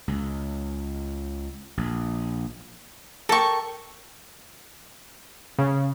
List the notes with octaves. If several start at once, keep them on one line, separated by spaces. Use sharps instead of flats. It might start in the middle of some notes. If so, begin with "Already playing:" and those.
C#2
A#1
A4 A#4 G5 C#6
C#3